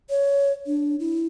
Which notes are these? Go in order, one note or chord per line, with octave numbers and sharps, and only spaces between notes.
C#5
D4
E4